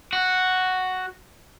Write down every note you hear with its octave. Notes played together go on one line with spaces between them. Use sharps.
F#4